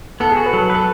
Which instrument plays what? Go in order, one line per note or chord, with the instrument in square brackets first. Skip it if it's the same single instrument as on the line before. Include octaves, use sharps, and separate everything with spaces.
[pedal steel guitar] B3 [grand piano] A4
[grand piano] G#4
[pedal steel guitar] F#4
[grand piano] B4
[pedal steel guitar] F#3 [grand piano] A4
[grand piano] A4
[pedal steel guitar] B4
[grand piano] A4